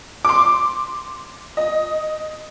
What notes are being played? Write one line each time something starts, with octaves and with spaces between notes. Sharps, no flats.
C6 D6
D#5